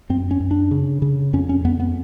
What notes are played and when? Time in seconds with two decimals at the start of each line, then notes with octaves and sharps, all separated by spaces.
0.10 F#2 C4
0.31 C#4
0.40 F#2
0.51 D4
0.71 C#3
1.02 C#3
1.33 F2 C#4
1.49 C#4
1.65 F2 B3
1.80 B3